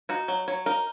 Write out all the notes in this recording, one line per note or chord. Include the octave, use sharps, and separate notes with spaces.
D#4 F#4
F#3
F#3 C#5
D#4 A#4